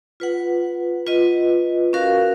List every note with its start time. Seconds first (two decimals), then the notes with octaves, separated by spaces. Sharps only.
0.20 F4 B4 F#5
1.07 F4 B4 D#5
1.93 C#4 F#4 A#4 F5